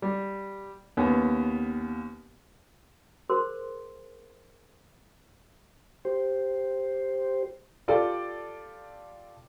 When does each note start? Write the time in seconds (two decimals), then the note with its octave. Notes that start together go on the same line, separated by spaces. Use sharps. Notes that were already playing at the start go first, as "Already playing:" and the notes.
0.02 G3
0.97 D#2 B3 C#4
3.30 G#4 A#4 C5 C6
6.05 G4 C5
7.88 F4 G4 A4 D5